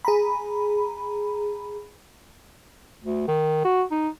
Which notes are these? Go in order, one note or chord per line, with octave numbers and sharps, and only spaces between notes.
G#4 A#5 B5
D2
D#3
F#4
D#4